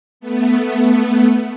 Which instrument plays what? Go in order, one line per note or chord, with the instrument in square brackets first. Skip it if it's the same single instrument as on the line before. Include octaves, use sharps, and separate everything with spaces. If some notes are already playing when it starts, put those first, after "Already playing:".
[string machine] A3 B3